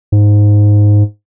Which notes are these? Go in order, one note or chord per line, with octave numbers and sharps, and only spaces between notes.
G#2